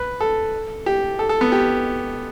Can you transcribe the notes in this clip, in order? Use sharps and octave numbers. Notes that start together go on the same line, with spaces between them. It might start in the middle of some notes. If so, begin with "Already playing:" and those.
Already playing: B4
A4
G4
A4
A4
B3
G4